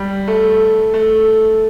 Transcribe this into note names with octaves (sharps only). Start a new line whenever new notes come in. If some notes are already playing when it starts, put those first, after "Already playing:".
Already playing: G3
A3
A3